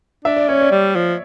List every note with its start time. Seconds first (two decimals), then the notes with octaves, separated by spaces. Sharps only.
0.25 D4 E5
0.37 D5
0.49 C#4 C#5
0.61 D5
0.71 G3
0.96 F3